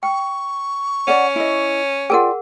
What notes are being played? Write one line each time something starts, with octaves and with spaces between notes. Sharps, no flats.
G5 C#6
C#4 D5 F#5
E4 D#5
F4 G#4 A#4 D5 F#5 G5